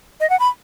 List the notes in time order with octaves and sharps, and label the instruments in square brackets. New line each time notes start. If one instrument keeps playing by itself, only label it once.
[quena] D#5
F#5
B5